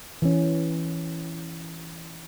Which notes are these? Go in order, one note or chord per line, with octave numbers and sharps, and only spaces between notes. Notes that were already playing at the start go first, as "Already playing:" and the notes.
E3 C#4